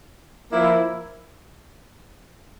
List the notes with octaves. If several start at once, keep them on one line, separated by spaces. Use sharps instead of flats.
F3 A#3 E4